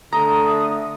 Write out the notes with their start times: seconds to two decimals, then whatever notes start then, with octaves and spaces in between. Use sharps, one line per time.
0.13 D3 A3 A#5 D#6